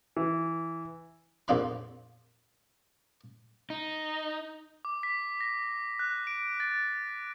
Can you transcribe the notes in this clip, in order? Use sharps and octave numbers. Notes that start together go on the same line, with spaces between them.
E3
A#1 F2 A#3 D4 F5 B5
D#4
D6
B6
A#6
F#6
D7
A6